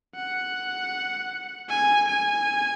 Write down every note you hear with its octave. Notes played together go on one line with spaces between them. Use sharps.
F#5
G#5
G#5